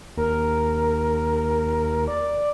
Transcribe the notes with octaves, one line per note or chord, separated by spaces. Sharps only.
D#2 A#4
D5